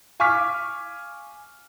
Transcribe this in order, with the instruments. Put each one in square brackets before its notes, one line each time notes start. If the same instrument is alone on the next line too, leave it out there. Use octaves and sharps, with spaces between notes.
[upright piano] F5 G#5 C#6 D6 F6 B6